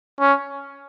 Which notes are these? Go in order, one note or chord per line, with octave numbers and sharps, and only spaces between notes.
C#4